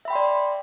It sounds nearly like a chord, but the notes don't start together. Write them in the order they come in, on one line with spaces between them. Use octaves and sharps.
E5 B5 G5 C6 D5